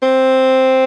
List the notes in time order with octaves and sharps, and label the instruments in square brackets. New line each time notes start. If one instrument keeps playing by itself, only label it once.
[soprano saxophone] C4